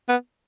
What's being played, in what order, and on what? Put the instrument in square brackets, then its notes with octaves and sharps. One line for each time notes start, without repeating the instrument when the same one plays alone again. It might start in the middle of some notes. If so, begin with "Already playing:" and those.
[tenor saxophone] B3